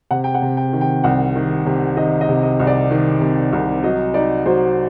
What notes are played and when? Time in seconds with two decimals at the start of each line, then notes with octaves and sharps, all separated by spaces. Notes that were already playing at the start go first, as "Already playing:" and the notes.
0.11 C3 F#5
0.24 G5
0.35 F#5
0.42 C3
0.57 G5
0.73 D#3
0.81 G5
1.04 C2 F#5
1.36 D#3
1.66 C3
1.97 D#3 D#5
2.21 D#5
2.29 C3
2.43 D#5
2.60 C2
2.67 D5
2.91 D#3
3.21 C3
3.53 C2
3.84 F#3 D#5
4.14 D#4 D5
4.45 F#3 C5